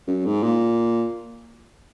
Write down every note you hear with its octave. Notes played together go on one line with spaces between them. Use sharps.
F#2
G#2
A#2